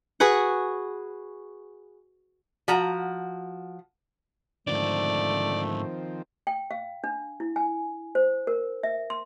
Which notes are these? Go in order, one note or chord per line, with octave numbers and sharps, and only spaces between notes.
F#4 G#4 B4 F#5
F3 F#4 A#5
G#2 D3 D#3 F3 A3 C4 D5
G5
F5
D4
E4
G#5
C5
A#4
E5
C6